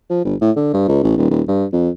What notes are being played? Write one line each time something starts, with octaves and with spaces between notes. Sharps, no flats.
F3
G1
A2
D3
G2
C#2
A1
D#1
D#1
G2
F2